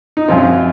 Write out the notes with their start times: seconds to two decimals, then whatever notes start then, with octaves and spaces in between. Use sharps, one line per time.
0.17 D#4
0.28 F#2 F3 C4 F4